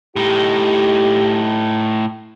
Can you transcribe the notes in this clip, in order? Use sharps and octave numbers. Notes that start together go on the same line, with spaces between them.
A2 D#4 G4